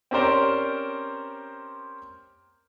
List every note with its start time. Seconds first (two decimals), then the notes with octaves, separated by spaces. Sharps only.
0.11 C4 C#4 G4 A#4 C5 D5